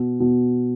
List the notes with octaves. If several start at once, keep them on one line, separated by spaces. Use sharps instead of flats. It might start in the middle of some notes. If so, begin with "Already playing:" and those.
Already playing: B2
B2